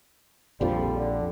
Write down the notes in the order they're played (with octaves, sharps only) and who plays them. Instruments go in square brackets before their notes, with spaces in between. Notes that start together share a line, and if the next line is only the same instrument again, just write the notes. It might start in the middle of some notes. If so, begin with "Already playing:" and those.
[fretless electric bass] A#1 F2 F3 [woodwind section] D3 G3
[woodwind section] D3